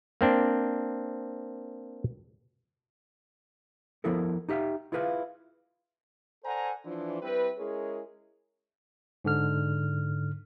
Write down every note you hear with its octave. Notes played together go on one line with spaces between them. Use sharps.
A#3 C4 D4
F3 B3 E4 A4 A#4
D#4 G4 E5 F5
E4 F4 G#4 B4 D5 F5
A4 C5 D5 F#5 G#5 A#5
E3 F3 D4
G3 C4 E4 B4
G#3 C#4 E4 G#4 A#4
G#2 D3 F6